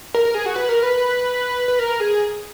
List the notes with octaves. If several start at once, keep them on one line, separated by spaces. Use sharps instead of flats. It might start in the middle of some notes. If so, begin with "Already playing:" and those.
A#4
A#4
G#4
F#4
B4
A#4
B4
B4
A#4
G#4